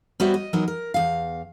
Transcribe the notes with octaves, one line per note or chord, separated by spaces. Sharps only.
G3 B3 F#4 C5 C#5 E5
D#5
E3 F#3 B3 D#4 A#4
A#4
E2 F5